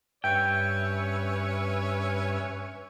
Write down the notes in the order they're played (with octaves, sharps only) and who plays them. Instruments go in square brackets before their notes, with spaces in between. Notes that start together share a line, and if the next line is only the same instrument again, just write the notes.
[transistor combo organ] G2 E5 [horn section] C#4 B4 C#5 [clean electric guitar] G5